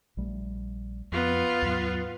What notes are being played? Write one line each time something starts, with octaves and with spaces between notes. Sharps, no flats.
A#1 G3 A3
F2 B3 F4
D#2 G#2 F#3